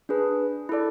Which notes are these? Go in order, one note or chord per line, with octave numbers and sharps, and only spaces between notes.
D4 G#4 B4
E4 A4 D5